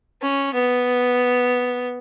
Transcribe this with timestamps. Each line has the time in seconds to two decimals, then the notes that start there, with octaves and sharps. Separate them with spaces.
0.22 C#4
0.54 B3